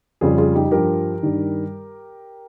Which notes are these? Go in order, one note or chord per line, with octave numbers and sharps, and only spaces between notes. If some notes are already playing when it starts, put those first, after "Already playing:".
F2 C#3 G3 F4 G#4
F4 G#4
D#4 G4
G2 F3 G4 A#4
G2 D#3 G3